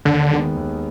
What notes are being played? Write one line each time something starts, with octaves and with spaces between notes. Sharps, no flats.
D#2 D3
D#3 G#3 B3
D#2